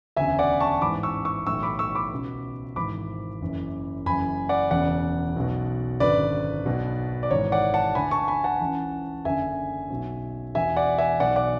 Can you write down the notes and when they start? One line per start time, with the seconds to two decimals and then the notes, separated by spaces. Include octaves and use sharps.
0.17 E1 D2 C#3 E5 G#5
0.39 D5 F#5
0.60 A5 C#6
0.81 A1 G#2 E3 B5 D6
1.03 C#6 E6
1.25 C#6 E6
1.47 B1 A2 E3 C#6 E6
1.63 B5 D6
1.79 C#6 E6
1.95 B5 D6
2.12 C#2 B2
2.76 G#1 G#2 E3 B5 D6
3.41 F#1 F#2 E3
4.06 F#1 F#2 E3 G#5 B5
4.49 D5 F#5
4.71 E1 E2 C#3 D5 F#5
5.36 B1 B2
6.00 G#1 F#2 D3 B4 D5
6.66 B1 B2
7.23 D5
7.31 G#1 G#2 E3 C#5
7.52 D5 F#5
7.74 F#5 A5
7.95 D2 D3 G#5 B5
8.11 A5 C#6
8.28 G#5 B5
8.44 F#5 A5
8.60 C#2 C#3 E3
9.25 F#1 F#2 D3 E5 G#5
9.90 B1 B2
10.55 E1 E2 B2 E5 G#5
10.76 D5 F#5
10.98 E5 G#5
11.20 B1 B2 D5 F#5
11.36 D5 F#5